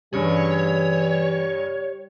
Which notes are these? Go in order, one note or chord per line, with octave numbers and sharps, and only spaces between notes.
G2 C#3 E3 G3 C#5